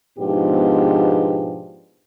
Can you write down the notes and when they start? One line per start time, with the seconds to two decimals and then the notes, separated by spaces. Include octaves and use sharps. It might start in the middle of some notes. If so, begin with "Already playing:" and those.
0.19 G#2 B2 F3 B3 D4 G4